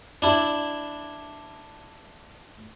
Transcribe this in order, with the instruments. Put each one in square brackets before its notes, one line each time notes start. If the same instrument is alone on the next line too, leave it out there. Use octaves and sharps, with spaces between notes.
[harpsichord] D4 E4